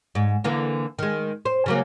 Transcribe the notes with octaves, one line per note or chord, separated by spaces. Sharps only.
G#2
D3 E3 A#3
D#3 G#3
C5
C#3 F#3 A#3